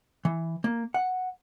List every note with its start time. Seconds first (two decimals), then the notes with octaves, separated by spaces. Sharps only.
0.25 E3
0.64 A#3
0.94 F#5